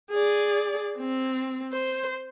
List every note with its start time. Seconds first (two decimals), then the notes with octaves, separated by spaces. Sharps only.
0.11 G#4 D5
0.98 C4
1.73 C5